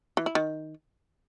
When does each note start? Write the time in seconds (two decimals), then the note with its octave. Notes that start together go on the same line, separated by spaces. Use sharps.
0.17 E3
0.26 E4
0.35 D#3